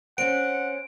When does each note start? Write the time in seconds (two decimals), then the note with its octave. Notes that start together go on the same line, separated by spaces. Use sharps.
0.18 C4 C#4 F#5 D7